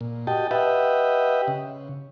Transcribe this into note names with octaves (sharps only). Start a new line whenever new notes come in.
A#2
F#4 G4 D#5 G5 A5
G4 B4 D#5 E5 F#5 G5
C#3